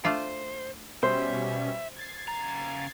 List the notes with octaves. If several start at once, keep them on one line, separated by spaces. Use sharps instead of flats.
A3 D4 F4 C5
B2 G3 C#4 C5 E5
G#6 A6 C7
C#3 A#5